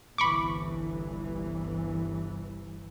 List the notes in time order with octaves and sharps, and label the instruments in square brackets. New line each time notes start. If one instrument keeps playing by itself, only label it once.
[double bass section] G1 C2 E3 [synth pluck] B5 C#6 D6